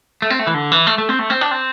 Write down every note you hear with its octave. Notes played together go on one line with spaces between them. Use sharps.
A3
C4
A3
E3
D3
E3
A3
A3
C4
A3
C4
D4
C4